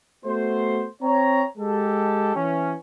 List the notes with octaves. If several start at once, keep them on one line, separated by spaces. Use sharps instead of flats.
A3 B3 F#4 C5
C4 C#5 A#5
G#3 G4 A4
E3 C#4